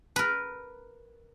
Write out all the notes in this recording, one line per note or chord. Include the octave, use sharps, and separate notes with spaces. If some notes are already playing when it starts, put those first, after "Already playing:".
A#4 B4